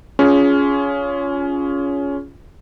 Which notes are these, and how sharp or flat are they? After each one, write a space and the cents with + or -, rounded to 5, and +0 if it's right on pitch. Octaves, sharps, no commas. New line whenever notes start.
C#4 +20 F4 +0 G#4 +0